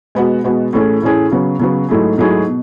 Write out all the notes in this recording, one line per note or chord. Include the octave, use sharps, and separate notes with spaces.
B2 G#3 B3 F#4
B2 G#3 B3 F#4
A2 E3 A3 C#4 G#4
A2 E3 A3 C#4 G#4
C#3 F#3 B3
C#3 F#3 B3
G#2 F#3 A3 E4 G#4
G#2 F#3 A3 E4 G#4
B2